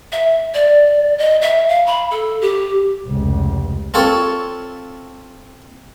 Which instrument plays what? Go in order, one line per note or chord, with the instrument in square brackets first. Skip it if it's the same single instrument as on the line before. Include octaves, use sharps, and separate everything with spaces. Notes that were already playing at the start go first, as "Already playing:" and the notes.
[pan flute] E5
D5
D#5
E5
F5
B5
A4
G4
[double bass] F1 C#2
[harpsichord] C4 F4 A4 C#5